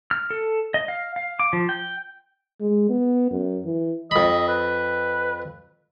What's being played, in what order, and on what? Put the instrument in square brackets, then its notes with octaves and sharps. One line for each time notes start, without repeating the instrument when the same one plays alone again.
[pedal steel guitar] F6
A4
D#5
F5
F5
D6
F3
G5
[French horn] G#3
B3
F#2
E3
[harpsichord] F2 B5 [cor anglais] D#5
[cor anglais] B4